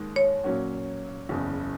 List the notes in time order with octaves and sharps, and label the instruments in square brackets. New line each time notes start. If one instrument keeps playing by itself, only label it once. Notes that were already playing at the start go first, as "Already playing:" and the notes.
Already playing: [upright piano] D#2 D#3 G#3
[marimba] C#5
[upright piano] A#2 F#3 C#4 F#4
F#1 E2 C#3